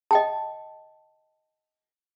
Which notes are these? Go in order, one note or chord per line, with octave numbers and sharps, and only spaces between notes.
D#5 G5 A5